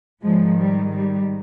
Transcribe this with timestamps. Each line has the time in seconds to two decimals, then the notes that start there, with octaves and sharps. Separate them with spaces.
0.23 G#2 D#3 F3 G#3
0.58 G3
0.93 G3